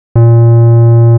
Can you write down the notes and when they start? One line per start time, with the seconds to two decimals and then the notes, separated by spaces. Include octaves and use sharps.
0.16 A#2